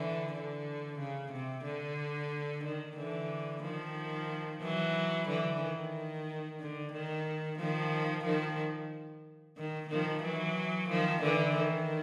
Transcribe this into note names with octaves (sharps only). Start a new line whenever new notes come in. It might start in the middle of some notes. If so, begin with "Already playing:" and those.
Already playing: D3 E3
D3
C#3
C3
D3
D#3
D3 E3
D#3 F3
E3 F#3
D3 E3
D#3
D3
D#3
D#3 F3
D#3 F3
D#3
D#3 F3
E3 F#3
D#3 F3
D3 E3
D#3